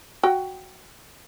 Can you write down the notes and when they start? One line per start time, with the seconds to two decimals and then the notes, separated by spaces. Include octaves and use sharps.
0.23 F#4 G5